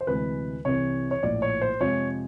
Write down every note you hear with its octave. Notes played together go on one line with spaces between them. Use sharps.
C5
D2 C3 E3 G#3 B4
C2 C3 E3 C#5
C#5
A#1 A2 F3 D5
C#5
C5
F2 C3 F3 G#3 C#5